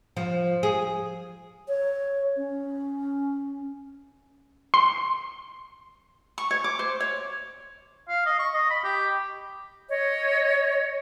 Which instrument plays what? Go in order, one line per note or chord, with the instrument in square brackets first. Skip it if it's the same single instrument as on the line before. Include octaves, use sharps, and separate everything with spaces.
[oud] F3
G#4
[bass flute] C#5
C#4
[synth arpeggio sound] C6
[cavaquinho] C#6
C#5
D6
C5
C#5
[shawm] F5
D#5
C#6
D#5
B5
G4
[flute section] C#5 D#5